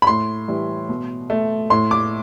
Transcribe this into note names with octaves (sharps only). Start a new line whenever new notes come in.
B5
A2 C6
E3 G3
B2
A3
A2 C6
D6